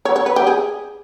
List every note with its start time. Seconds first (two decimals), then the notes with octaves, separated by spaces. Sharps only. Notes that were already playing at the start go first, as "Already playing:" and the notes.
0.05 C#5
0.16 C#5
0.26 B4
0.36 G4
0.47 G#4